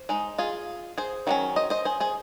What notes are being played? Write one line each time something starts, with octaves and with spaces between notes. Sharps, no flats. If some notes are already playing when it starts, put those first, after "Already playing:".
Already playing: C5
G#3 D#4
F4 G#4
G#4 C5
D#3 F#3 A#3 C#4
C5 D#5
C5 D#5
G#4 C5
G#4 C5